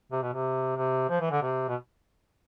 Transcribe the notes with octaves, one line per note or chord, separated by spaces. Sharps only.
C3
B2
C3
C3
F3
E3
D3
C3
B2